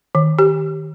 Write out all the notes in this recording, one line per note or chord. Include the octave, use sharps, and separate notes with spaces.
D#3
G4